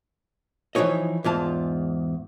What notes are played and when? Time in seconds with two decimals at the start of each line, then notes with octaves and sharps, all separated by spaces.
0.75 E3 F3 D#4 C#5 D#5
1.24 E2 G#2 F4 A5